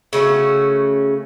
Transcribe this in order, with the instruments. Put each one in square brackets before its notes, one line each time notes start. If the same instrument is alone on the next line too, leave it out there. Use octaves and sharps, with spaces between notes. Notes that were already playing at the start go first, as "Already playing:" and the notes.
[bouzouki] C#3 A3 C#4 F#4